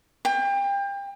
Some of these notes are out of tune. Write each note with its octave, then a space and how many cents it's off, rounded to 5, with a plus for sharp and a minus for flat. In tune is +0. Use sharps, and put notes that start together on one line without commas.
G5 +30